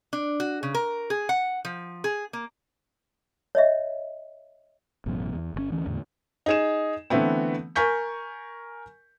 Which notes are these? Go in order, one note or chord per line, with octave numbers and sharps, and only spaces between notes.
D4
F#4
C#3
A#4
G#4
F#5
F3
G#4
A#3
C#5 D#5 E5
A1 F#2 B2
E2
G1 B2 C#4
D2 E3 C#4
E2 A2 D3
D#4 G#4 E7
D3 E3 A3 B3 C4
A#4 G#5 C#6 G6 B6